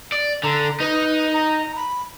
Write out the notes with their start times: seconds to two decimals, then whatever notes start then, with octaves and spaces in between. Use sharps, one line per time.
0.12 D5
0.43 D3 A#5
0.80 D#4 B4
1.33 A#5
1.75 B5